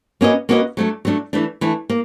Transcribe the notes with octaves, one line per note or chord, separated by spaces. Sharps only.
A#3 C#4 F#4 B4 D#5
A#3 C#4 F#4 B4 D#5
F#3 A3 D4
F#3 A3 D4
E3 A3 D4
E3 A3 D4
A#3